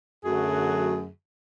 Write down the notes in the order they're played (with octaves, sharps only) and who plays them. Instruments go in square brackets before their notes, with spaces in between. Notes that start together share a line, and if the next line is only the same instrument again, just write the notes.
[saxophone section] F#2 D3 F#3 A3 F#4 G#4